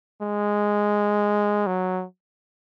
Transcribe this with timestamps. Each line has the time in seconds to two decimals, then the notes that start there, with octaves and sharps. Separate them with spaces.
0.22 G#3
1.67 F#3